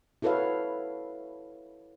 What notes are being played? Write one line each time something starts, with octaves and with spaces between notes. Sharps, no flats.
E4 F#4 A4 B4 C#5 F5